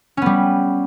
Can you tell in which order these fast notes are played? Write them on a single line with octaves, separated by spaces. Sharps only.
C#4 B3 G3